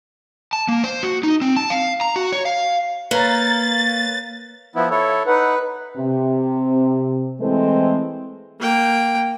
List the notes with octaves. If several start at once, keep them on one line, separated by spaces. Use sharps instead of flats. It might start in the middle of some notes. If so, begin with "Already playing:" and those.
A5
A#3
C5
F#4
D#4
C4
A5
F5
A#5
F#4
C#5
F5
A#3 B4 C#5 A#5 A6
F3 B3 E4
E4 A4 C#5
D#4 B4 F#5
C3
E3 G#3 A3 C4 A4 C5
A#3 G5